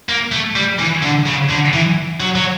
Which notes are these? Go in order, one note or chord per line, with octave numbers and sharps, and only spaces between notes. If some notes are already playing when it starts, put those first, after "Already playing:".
A#3
A3
G3
E3
D3
C#3
D3
E3
F#3
F#3